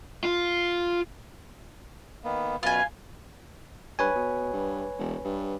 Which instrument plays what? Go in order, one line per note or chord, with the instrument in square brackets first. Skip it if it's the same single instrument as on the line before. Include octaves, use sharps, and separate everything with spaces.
[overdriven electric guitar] F4
[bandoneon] D#3 A#3 B3
[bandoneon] F#2 B2 B4 [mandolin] F4 G#5
[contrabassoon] G2 [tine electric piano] B4 C#5 G#5
[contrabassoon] B2
G2
E1
G2